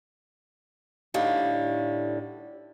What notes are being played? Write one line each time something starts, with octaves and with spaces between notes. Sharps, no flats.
A2 D3 G3 D#4 F5